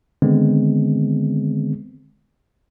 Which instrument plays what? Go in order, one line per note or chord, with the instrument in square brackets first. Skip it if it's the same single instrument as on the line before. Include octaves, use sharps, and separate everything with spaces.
[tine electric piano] D3 D#3 G#3 B3 C4